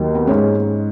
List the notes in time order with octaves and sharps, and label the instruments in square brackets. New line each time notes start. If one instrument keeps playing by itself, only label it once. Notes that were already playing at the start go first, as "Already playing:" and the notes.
Already playing: [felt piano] D#2 D#3 F#3 F#4
B3
G#2 G#3 C#4